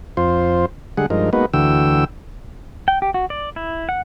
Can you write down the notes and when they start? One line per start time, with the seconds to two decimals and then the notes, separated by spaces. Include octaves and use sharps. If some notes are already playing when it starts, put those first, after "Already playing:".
0.17 F2 F4 C5
0.97 D3 G3 G#3 G#4 F#5
1.10 G2 F3 G#3 D#4 A#4
1.33 G#3 A#3 B3 D#4 F#4 B4
1.53 D2 D3 E3 F#4 G5 E6
2.88 G5
3.02 G4
3.14 F#4
3.30 D5
3.56 E4
3.89 F#5